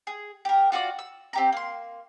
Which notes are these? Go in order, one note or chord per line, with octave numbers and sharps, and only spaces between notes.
G#4
G4 A#4
F4 F#4 A4 D5
E6
C4 G4 A#5
A#3 C6